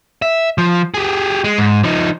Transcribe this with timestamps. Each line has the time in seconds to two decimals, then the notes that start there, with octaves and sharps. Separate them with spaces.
0.22 E5
0.58 F3
0.94 G4 G#4
1.44 G#3
1.58 G#2
1.84 F3 D#4